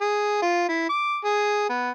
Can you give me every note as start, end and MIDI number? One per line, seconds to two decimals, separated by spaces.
0.01 0.38 68
0.42 0.67 65
0.69 0.86 64
0.89 1.18 86
1.25 1.68 68
1.70 1.90 59